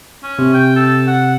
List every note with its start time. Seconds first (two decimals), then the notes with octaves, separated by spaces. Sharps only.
0.23 C#4
0.39 C3
0.54 G5
0.76 A4
1.08 F#5